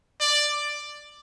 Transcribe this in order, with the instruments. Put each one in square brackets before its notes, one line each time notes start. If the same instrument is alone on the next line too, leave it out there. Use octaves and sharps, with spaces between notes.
[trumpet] D5